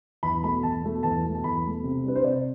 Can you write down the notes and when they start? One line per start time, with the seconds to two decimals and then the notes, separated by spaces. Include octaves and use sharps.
0.23 E2 B5
0.43 B2 A3 B5
0.63 E2 A5
0.83 B2 A3
1.03 E2 A5
1.23 B2
1.28 A3
1.35 A5
1.44 E2 B5
1.64 B2 A3
1.84 C3
2.04 G3 D4 B4
2.16 C5
2.23 C3 D5